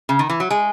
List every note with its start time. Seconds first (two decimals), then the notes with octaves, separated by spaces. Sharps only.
0.09 C#3
0.19 D#3
0.30 E3
0.40 F#3
0.51 G#3 G#5